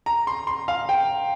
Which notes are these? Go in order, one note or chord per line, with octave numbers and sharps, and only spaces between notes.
A#5
C6
C6
F5
G5